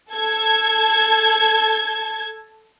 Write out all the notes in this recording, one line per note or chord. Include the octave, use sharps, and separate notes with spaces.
A4 A5 G#6